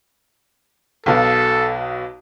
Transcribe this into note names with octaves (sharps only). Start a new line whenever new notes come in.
B1 B2 A4 F5